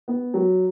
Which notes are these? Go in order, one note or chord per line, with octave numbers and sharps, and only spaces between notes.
B3
F#3